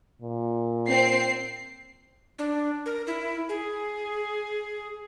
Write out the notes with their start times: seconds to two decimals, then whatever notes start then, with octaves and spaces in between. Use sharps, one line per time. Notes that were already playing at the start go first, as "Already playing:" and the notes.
0.22 A#2
0.86 C4 C7
2.39 D4
2.86 A#4
3.07 E4
3.49 G#4